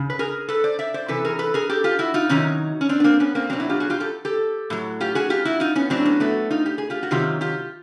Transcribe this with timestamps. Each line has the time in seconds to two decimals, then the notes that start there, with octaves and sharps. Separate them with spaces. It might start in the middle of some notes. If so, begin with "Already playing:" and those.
Already playing: C#3
0.10 B4
0.19 G#4 A#4
0.49 A4 B4
0.64 C5 D5
0.79 D5 E5
0.94 C5 D5
1.08 C3 E3 A4 B4
1.25 G#4 A#4
1.39 A4 B4
1.54 G#4 A#4
1.69 G4 A4
1.84 F4 G4
1.99 E4 F#4
2.14 D#4 F4
2.29 C3 D#3 F#3 C#4 D#4
2.81 C#4
2.89 C4 D4
3.00 B3
3.04 A#3 C4
3.20 B3 C#4
3.35 A#3 C4
3.50 B2 F#3 C4 D4
3.60 D4 E4
3.69 F4 G4
3.80 F#4 G#4
3.90 F4 G4
4.00 G4 A4
4.25 G4 A4
4.70 A2 F#3
5.00 F4 G4
5.15 F#4 G#4
5.30 F4 G4
5.45 E4 F#4
5.60 D#4 F4
5.75 B3 C#4
5.90 A2 F#3 C4 D4
6.05 B3 C#4
6.20 A3 B3
6.50 D#4 F4
6.66 G4
6.78 G#4
6.90 F4 G4
7.03 F#4
7.11 C3 D#3 F#3 F4 G4
7.41 F4 G4